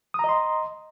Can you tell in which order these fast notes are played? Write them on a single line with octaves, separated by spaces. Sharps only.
D#6 A#5 D#5 C6